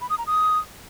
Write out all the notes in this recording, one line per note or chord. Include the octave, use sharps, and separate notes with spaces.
B5
D#6
A#5
D#6